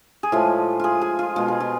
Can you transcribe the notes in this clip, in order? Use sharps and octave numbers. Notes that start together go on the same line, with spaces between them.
G#4
A2 F3 G#3 F4
F4 G#4
G#4
F4
B2 G#3 F4
G#4
F4